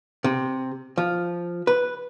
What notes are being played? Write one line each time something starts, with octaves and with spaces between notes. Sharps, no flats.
C3
F3
B4